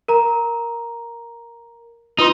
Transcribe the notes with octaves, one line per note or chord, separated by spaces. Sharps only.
A#4 A#5
D#4 F4 B4 C6